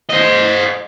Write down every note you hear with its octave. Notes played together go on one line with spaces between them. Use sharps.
C5 D#5